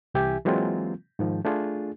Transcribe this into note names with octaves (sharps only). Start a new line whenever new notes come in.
C2 E3 G4 E5 G#5
E3 F#3 G#3 A#3 C4 F4
G#2 D#3 F3
A3 D4 F4 G#4